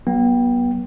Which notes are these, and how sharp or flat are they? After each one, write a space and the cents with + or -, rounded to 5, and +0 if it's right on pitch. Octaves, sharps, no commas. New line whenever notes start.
F#3 +25 B3 -35 G5 +0